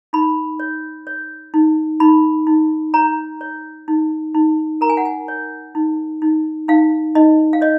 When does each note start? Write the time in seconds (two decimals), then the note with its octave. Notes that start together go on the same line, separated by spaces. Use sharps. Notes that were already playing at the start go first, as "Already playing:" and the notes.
0.13 D#4 B5
0.60 C#5
1.07 C#5
1.54 D#4
2.00 D#4 B5
2.47 D#4
2.94 C#5 A#5
3.41 C#5
3.88 D#4
4.34 D#4
4.81 A#4 A#5
4.90 G#5
4.97 F#5
5.05 G#5
5.28 C#5
5.75 D#4
6.22 D#4
6.68 D#4 F5
7.15 D#4 D#5
7.53 F5
7.61 C#5 D#5